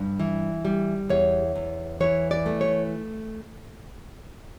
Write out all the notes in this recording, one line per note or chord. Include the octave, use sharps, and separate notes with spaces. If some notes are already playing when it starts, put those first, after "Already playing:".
Already playing: G2
E3
G3
E2 C#5
E2
E3 C#5
D5
A3
C#5